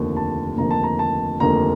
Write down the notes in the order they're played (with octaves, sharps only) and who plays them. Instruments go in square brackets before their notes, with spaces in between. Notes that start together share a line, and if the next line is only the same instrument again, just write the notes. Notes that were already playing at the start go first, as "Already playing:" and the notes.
Already playing: [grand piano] F1 D#2 D3 F3 A#3
A5
F1 D#2 D3 F3 A#3 A#5
A5
A#5
A5
F1 D#2 D3 F3 A#3 A#5